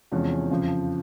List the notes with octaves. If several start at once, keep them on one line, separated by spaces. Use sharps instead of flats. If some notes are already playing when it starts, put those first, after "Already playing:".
E2 C3 F3 G#3 C#4
F2 C#3 F3